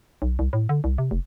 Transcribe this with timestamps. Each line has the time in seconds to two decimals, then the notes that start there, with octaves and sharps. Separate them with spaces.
0.22 B1
0.39 C2
0.53 A2
0.69 D3
0.84 C2
0.98 C3
1.11 F1